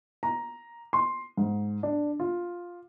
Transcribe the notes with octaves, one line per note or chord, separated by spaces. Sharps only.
A#5
C6
G#2
D4
F4